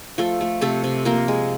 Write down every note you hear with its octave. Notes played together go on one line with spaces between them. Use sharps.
F3 A3 A4
A3
C3 A3 A4
C3
F3 A#3 A#4
G#3